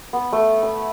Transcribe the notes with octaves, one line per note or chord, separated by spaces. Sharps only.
B3
A3
B5